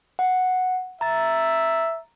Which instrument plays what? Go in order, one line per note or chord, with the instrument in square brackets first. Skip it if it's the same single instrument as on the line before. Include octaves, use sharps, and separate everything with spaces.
[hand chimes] F#5
[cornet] E5 [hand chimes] A#5 A6